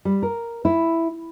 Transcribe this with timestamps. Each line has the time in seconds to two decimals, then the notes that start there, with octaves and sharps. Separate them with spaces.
0.05 G3
0.23 A#4
0.65 E4